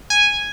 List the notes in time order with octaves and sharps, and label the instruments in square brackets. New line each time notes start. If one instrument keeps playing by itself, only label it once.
[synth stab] G#5